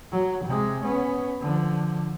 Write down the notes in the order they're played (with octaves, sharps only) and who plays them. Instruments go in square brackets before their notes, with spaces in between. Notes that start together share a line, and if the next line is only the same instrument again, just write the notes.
[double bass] F#3
C3 G#3
B3 C#4
D3 F3